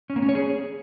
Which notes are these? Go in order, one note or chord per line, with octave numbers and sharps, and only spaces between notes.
C#4
A#3
C#4
C#5
G#4